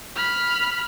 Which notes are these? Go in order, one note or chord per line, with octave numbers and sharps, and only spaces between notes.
B5 F6